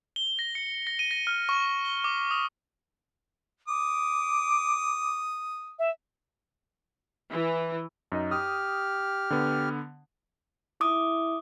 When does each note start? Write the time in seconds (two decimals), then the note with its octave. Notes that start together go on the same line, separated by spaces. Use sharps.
0.16 G7
0.39 A#6
0.55 C#7
0.87 A#6
0.99 D#7
1.11 A#6
1.27 F6
1.49 C#6
1.65 C#6
1.85 G7
2.04 D6
2.31 D#6
3.68 D6 D#6
5.78 E5
7.31 E3
8.12 F#2 D#4 D#5
8.31 G4 D#6 F6
9.30 D3 B3
10.81 E4 D6 D#6